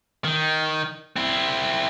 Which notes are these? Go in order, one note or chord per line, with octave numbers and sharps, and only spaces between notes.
D#3
C4 E4